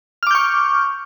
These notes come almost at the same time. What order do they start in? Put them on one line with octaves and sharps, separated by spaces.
F6 D6 G6 C#6